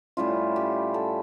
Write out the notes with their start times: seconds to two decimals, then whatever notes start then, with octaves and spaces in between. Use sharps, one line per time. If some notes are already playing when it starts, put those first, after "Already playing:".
0.17 A2 G3 C#4 E4 F4
0.56 G4
0.94 A4